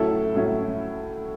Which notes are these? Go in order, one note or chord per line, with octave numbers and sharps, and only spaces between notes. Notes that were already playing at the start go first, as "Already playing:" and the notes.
Already playing: A2 F#3 C#4 E4 A4
A2 F#3 C#4 E4